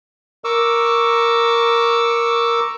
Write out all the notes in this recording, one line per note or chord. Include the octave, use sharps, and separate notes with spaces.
A#4 C#6 D6 E6